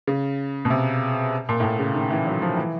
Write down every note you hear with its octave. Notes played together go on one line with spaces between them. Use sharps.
C#3
B2
C3
A#2
A2
A#2
C#3
D#3
E3
F#3
F3
E3